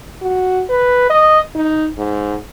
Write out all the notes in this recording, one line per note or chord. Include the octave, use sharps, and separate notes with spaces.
F#4
B4
D#5
D#4
G#2